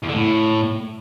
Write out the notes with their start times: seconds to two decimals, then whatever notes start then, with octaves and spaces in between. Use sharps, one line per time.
0.03 E2
0.08 D3
0.14 A2